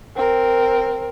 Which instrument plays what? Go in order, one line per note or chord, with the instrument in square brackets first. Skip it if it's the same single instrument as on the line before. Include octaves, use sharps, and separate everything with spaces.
[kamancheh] C4 A#4